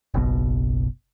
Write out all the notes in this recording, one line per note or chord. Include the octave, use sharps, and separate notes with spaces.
F#1 B1 B2